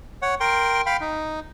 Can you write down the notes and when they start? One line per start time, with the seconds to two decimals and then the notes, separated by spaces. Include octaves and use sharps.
0.22 C#5 F#5
0.40 A#4 G5 C6
0.86 F5 G5 B5
1.01 D#4